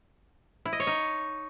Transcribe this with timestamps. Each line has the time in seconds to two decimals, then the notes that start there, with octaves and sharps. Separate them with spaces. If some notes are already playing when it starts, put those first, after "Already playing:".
0.66 E4
0.73 D#5
0.80 C#5
0.87 D#4